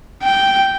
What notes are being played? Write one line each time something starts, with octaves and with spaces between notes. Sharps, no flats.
G5